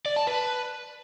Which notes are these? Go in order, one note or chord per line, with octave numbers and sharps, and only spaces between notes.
D5
A5
B4